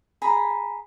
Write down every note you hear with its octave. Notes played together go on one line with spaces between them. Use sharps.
G#4 A#5 B5